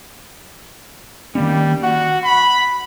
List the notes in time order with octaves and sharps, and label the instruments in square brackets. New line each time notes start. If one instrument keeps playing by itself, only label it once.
[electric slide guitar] D#3 A#3 C#4 [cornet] G3
[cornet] F#4 [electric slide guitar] F#5
[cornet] B5